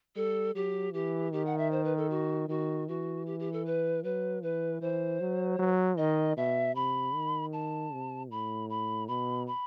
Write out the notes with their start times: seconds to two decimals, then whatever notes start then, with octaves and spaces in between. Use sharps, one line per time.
0.16 G3 A4
0.55 F#3 G4
0.93 E3 G4
1.33 D#3 G4
1.46 F#5
1.58 E5
1.72 C5
1.84 B4
1.97 A4
2.10 F#4
2.48 D#3 F#4
2.88 E3 F#4
3.26 G4
3.40 G4
3.53 A4
3.66 B4
4.04 F#3 B4
4.43 E3 B4
4.81 E3 C5
5.21 F#3
5.59 F#3
5.98 D#3 D#5
6.37 B2 E5
6.75 C3 B5
7.15 D#3
7.53 A5
7.93 C3
8.31 A2 B5
8.70 B5
9.08 B2 B5
9.47 B5